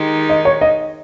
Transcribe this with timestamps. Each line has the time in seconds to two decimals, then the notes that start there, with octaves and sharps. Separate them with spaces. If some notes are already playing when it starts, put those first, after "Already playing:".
Already playing: D#3 G#3 D#4 G4
0.30 D#5
0.45 C#5
0.61 D#5